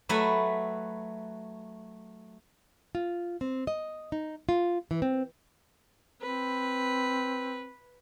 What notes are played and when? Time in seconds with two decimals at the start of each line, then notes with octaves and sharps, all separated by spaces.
0.09 F#3 A3 B4 E5
2.95 F4
3.41 C4
3.67 D#5
4.12 D#4
4.49 F4
4.91 E3
5.02 C4
6.22 C4 B4